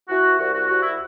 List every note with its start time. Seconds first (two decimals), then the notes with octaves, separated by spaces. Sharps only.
0.09 E3 F#4
0.39 C2 F#4
0.54 F#4
0.68 C2 F#4
0.83 E4